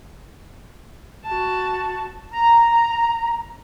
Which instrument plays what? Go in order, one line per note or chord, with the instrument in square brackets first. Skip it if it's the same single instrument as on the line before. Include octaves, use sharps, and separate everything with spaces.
[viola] F#4 A5
[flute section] A#5